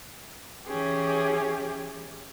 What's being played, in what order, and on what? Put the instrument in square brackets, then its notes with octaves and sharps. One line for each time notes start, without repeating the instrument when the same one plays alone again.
[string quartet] E3 C#4 G4 G#4